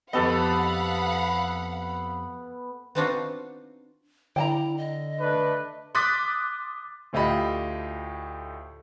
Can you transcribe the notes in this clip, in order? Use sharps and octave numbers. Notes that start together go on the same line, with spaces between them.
F2 B3 G4 A4 D#5 F5 F#5 B5
B3 C4 D4 D#4 F4 F#4
D3 E4 G5 A5 A#5
D#5
A3 D4 B4
C6 D6 D#6 F#6 A6 B6
D2 A2 F4 G4 D#5 B5